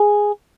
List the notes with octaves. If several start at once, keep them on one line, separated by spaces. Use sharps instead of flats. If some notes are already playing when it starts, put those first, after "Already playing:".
Already playing: G#4